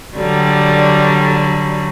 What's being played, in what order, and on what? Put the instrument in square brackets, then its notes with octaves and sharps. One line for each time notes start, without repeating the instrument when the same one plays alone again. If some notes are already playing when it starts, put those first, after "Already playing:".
[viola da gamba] D3 F#3 G3